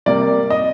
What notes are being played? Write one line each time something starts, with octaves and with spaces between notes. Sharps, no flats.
C3 G3 A#3 D5
D#5